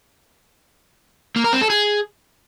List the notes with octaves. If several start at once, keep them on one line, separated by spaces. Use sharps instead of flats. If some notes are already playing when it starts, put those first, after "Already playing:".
A#3
A#4
C4
A4
G#4